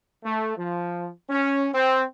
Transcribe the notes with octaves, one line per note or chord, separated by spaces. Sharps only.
A3
F3
C#4
C4